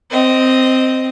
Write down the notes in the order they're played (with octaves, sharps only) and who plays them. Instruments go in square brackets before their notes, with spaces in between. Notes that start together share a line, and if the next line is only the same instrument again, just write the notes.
[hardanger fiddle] C4 D#5